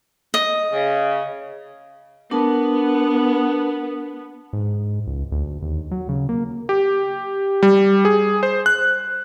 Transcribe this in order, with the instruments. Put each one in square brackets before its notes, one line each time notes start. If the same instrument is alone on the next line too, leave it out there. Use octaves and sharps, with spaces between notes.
[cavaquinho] D#5
[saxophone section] C#3
[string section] B3 [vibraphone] D4 A#4 A5
[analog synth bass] G#2
C#2
D2
D#2
F#3
C#3
A#3
[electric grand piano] G4
G3
G#4
C5
F#6